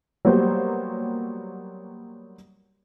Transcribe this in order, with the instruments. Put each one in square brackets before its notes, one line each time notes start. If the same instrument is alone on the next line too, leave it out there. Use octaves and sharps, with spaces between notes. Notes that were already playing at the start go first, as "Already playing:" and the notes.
[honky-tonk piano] F#3 G3 A#3 B3 C5